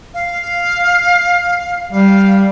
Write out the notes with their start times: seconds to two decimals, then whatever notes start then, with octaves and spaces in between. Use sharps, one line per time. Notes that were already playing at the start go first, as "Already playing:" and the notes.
0.13 F5
1.92 G3 F5